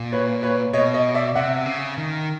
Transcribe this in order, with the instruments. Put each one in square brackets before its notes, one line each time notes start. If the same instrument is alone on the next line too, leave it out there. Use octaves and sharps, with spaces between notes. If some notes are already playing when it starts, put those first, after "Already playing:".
Already playing: [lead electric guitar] A#2
[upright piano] B4 C#5
B4 C#5
[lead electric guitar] B2 [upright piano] C#5 D#5
[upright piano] C#5 D#5
D5 E5
[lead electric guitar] C3 [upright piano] E5 F#5
[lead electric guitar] C#3
D#3